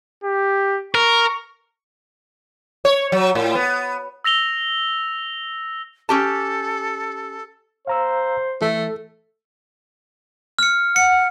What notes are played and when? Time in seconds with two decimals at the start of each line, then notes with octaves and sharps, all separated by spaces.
0.24 G4
0.95 A#4 C#6
2.85 C#5
3.12 F#3
3.35 A2
3.55 B3
4.24 E6 A#6 F7 G7
6.09 C#4 G4 A4 A5
7.87 C5 F5 A#5 E6
8.62 E3 A3 A4
10.59 F6 C#7
10.96 F#5 C#7